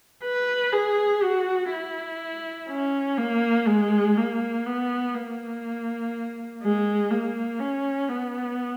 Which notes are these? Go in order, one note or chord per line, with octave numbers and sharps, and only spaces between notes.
B4
G#4
F#4
E4
C#4
A#3
G#3
A#3
B3
A#3
G#3
A#3
C#4
B3